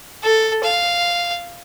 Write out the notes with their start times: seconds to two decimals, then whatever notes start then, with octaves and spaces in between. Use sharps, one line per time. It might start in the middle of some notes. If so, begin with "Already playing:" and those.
0.23 A4
0.64 F5